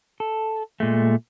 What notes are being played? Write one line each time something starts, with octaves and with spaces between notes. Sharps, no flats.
A4
A#2 G#3 A3